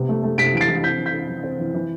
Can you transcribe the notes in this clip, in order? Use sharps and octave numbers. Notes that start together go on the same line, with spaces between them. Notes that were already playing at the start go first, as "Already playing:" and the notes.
Already playing: C3 B3
A3
A3
C3 B6 D7
E3 D7
A6 C7
E3
C4 G6 B6
E3
G6 B6
C4
E3
C4
E3
E3